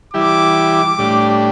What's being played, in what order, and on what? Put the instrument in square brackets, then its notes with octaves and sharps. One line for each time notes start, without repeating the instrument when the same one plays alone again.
[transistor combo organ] E3 G3 E4 G4 [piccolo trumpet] D6
[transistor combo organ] A2 G3 D4 G4